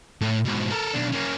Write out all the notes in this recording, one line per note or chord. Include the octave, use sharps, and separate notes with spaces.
A2
G#2 B2
A4 A#4
B1 D4
A#3 C#4